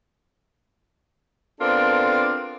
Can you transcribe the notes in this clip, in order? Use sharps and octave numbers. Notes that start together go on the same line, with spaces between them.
B3 C4 D4 F4 A4 A#4